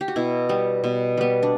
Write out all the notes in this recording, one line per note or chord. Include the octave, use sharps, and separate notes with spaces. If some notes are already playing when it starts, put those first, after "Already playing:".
G4
F#4
B2 E4
G3 B3
B2
G3 B3
D4